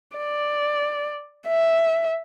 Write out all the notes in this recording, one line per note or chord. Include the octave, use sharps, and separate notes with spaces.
D5
E5